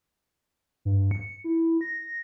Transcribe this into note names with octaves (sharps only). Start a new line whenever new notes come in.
G2
C#7
E4
A#6